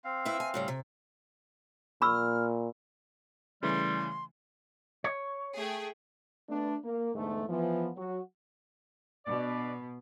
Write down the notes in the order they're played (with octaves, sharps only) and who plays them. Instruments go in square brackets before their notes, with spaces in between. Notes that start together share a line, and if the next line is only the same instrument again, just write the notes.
[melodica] C4 F5
[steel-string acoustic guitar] E4 B4 E5
G#5
A2 C#3 G3
C3
[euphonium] A#2 [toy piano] B5 C#6 E6 [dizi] F6
[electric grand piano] C#3 E3 A3 [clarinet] G3 [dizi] C6
[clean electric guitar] C#5
[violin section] A3 G#4 G5
[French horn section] A3 B3 D4
A#3
E2 G#2 D3 A3
E3 F3 B3
F#3 F#4
[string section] B2 [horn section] D4 D5